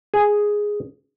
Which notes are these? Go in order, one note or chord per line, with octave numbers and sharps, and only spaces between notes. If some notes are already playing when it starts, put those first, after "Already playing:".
G#4